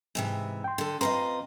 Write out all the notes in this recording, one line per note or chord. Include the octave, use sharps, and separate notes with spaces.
G#2 C3 E3
G5 C6
D3 A4
C4 F4 B4 D#5 A#5 C6